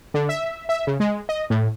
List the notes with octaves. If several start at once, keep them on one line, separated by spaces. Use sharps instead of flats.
D3
E5
E5
C#3
G#3
D#5
A2